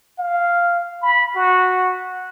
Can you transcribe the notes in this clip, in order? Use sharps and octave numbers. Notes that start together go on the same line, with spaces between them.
F5
B5
F#4